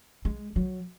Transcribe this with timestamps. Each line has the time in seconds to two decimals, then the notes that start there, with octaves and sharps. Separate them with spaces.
0.25 G#3
0.56 F#3